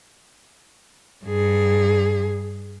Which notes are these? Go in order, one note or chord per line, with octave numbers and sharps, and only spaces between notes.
G2 G#4